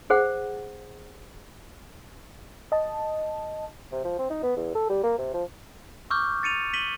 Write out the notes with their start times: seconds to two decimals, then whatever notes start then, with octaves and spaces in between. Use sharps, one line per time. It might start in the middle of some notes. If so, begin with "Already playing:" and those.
0.10 G#4 C5 F#5
2.72 D#5 A5
3.92 C3
4.05 F3
4.19 C4
4.30 D#4
4.43 B3
4.57 E2
4.75 A4
4.90 G3
5.04 A#3
5.18 C3
5.34 F3
6.11 C#6 D6 E6 F6 G6
6.43 A6 C#7 D#7 F7
6.73 B6 D#7 F#7 G7